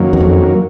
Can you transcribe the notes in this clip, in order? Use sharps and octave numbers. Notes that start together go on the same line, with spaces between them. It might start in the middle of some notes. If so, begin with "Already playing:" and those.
Already playing: F#2 D#3 F#3 A#3
E2
F2